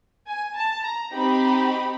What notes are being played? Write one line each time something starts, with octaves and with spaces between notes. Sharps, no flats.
G#5
A5
A#5
C4 D#4 G4 B5